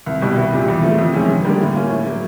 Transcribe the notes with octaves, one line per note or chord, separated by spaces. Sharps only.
C2
B2 G3
C2
A#2 G3
E2
C#3 F3 A3
F2
C3 D#3 G#3 C#4
G2
D3 G3 A#3
A2
F3 A#3 C#4 F4
A2
F#3 A#3